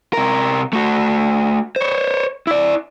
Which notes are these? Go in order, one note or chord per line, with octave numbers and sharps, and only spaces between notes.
C3 A#4
A3 F#4
C5 C#5
E4 D5